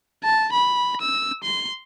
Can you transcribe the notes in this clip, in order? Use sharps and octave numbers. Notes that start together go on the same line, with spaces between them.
A5
B5
E6
C6